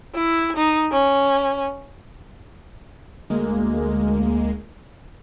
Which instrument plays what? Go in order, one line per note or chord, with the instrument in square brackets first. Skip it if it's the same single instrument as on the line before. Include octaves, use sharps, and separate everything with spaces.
[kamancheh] E4
D#4
C#4
[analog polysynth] D2 G#3 A#3